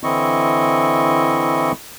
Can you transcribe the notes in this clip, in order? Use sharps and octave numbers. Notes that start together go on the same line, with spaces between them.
D3 E3 C4 E4 D#5 C#6